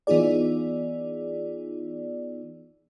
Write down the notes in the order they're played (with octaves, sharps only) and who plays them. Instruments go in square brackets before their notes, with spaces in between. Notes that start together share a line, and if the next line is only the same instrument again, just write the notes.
[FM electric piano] E3 B3 D#4 F4 G#4 D5